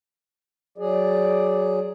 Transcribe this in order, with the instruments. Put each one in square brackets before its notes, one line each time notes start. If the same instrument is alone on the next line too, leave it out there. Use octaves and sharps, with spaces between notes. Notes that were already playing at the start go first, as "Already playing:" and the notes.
[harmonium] F#3 G#4 [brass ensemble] D5